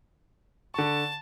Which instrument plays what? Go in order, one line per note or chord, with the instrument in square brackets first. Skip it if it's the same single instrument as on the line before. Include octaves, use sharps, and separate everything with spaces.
[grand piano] D3 C#6 [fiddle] A5